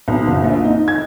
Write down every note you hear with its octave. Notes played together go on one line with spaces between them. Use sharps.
B1
F#1
A#1
D#4
G#6